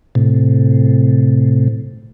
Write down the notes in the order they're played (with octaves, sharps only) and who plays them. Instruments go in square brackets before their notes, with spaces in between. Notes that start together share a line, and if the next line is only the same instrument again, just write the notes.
[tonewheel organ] A2 C3